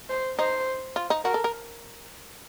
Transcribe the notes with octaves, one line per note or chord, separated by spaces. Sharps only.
C5
D#4 C5
F4
D#4
F#4 A#4
A4
A#4